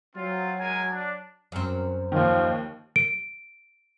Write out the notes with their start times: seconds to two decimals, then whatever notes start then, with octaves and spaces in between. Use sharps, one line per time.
0.16 F#3 C4 F4
0.60 G#3 A#4 G#5
0.91 D4
1.52 F#2 C4
2.12 D#2 D#3 F3
2.96 D7